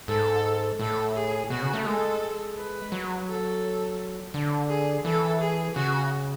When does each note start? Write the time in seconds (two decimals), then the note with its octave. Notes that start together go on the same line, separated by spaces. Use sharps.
0.08 G#2 A4
0.79 A2 A4
1.15 G#4
1.50 B2 F#4
1.62 C#3
1.73 A3
1.86 G#3 A4
2.56 B4
2.92 F#3
3.28 A4
4.34 D3
4.69 G#4
5.05 E3 A4
5.40 G#4
5.75 C#3 F#4